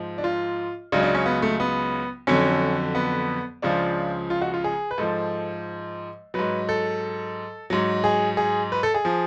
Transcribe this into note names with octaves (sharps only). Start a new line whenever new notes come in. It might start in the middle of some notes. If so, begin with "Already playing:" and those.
Already playing: G#2 F3
D4
F4
C#2 C#3 F#3 D4
D4
C#4
B3
A3
B3
F2 D3 F#3 C#4
B3
C#2 C#3 F3 D4
F4
F#4
F4
G#4
B4
G#2 F3 A4
G#2 F#3 B4
A4
G#2 F#3
G#4
G#4
B4
A4
G#4
F3